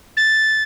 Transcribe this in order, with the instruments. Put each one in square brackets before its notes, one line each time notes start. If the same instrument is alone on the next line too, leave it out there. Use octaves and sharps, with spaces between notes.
[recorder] A6